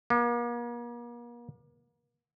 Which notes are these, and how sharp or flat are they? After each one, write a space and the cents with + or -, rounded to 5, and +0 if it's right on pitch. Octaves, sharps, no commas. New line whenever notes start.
A#3 +40